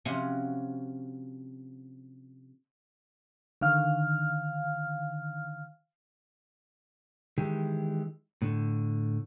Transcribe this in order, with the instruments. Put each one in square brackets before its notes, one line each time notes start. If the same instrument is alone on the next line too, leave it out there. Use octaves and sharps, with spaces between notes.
[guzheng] C3 F3 C#4 F#4
[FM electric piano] D3 D#3 F5 F6
[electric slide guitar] D#3 E3 G#3 G4
A2 D3